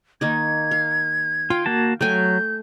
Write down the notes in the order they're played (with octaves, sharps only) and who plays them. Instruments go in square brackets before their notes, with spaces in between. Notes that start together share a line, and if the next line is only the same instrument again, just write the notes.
[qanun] D#3 A#3 D#4 [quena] G#6
[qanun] F5
[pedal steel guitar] F4 [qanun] F5 G5
[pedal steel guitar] A#3 F#4 A5
[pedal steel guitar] F#3 [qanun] A3 G5 G#5 [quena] G6